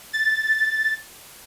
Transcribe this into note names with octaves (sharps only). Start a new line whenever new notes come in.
A6